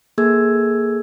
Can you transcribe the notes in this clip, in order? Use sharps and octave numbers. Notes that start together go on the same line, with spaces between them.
A#3 G#4 A4 E6 G#6